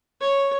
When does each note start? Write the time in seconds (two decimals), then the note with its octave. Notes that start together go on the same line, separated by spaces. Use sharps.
0.20 C#5